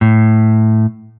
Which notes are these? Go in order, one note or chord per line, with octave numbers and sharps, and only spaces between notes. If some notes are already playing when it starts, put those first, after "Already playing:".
A2